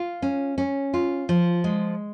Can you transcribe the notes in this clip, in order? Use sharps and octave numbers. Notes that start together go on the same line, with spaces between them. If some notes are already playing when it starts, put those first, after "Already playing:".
Already playing: F4
C#4
C#4
F4
F3
G#3